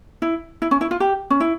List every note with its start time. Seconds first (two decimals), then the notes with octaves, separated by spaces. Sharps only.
0.22 E4
0.62 E4
0.71 C#4
0.81 E4
0.91 F4
1.00 G4
1.30 C#4
1.40 E4